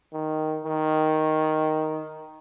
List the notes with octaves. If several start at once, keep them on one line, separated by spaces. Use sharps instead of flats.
D#3
D#3